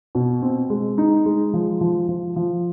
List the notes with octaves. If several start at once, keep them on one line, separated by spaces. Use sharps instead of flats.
B2
C4
G#3
D#4
G#3
F3
F3
F3
F3